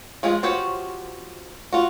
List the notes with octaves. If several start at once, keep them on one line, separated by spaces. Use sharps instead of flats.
F3 G#3 F4 G#4
F3 F#4 G4 C5 C#5
F4 F#4